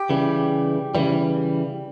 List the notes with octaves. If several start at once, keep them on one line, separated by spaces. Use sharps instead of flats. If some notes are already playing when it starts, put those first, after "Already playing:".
Already playing: G4
C#3 E3 G3
C#3 E3 G3